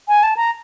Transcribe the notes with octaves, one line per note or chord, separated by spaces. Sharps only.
G#5
A5
A#5